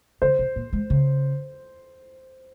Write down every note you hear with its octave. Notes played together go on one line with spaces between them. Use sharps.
C#3 C5
C3
A#2
G#3
C#3